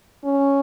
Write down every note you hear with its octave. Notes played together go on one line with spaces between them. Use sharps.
C#4